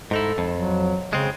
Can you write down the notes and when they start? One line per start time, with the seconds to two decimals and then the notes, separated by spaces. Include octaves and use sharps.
0.11 G#2 D#4 E4 A4
0.38 F2
0.55 F#3
1.13 C#3 G#3 C4